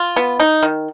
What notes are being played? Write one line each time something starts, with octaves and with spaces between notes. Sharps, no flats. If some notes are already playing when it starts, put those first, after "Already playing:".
Already playing: F4
B3
D#4
D#3